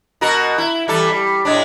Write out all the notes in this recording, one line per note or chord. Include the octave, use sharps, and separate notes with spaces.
B2 F#4 A#4
E4
E3 G3 A4
G3
A2 G#3 D4